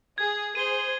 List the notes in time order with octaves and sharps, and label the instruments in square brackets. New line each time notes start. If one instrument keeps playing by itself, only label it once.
[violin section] G#4 [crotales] G#6
[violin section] G#4 C5 [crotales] D#7 G7